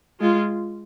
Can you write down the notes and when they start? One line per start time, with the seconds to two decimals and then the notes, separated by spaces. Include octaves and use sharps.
0.21 G#3 F4